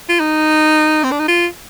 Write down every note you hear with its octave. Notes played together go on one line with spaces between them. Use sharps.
F4
D#4
C4
D4
D#4
F4